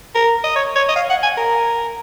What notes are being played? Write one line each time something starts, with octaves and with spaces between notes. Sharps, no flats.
A#4
D#5
C#5
C#5
D#5
F5
F#5
G#5
A#4